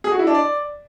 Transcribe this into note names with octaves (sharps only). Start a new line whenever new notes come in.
G#4
F#4
E4
D4
D5